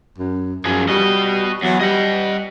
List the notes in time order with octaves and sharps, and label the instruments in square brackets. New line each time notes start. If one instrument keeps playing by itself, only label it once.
[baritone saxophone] F#2
[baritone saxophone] F#2 [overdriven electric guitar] F3 G#4
[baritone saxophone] G3 [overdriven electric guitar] F#4 D#5
[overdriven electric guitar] E2 [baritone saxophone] F#3
[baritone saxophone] G3 [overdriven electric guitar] D#5 F#5